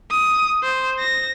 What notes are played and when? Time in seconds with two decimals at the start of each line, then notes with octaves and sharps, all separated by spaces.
0.11 D#6
0.63 C5
1.00 A#6